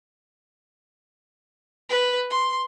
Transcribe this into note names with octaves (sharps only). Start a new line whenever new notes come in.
B4
C6